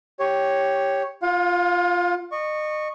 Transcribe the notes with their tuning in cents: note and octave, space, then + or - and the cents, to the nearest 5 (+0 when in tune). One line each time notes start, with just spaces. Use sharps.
G4 +0 C#5 +0
F4 +0 F5 +35
D#5 -30 C#6 -5